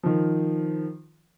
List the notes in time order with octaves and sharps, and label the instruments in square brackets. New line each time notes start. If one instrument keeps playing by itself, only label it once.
[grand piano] D#3 F3